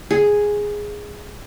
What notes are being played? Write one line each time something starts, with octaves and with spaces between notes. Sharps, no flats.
G#4